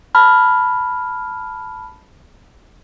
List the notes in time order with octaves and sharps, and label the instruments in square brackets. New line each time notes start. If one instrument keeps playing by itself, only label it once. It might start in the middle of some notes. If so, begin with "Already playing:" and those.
[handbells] A5 B5 F6